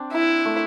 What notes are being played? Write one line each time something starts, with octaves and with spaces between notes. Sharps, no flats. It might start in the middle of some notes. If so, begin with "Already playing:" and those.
Already playing: C4 D4
E4
A3